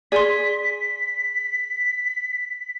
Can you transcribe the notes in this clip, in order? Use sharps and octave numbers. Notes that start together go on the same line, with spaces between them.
G#4 D5 C6 B6